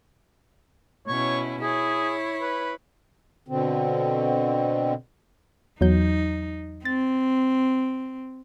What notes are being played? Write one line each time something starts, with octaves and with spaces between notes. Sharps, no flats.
B2 C#4 E4 C#5
E4 G#4 C#5
B4
B2 D3 C4
E2 F#3 D#4 G6
C4 A6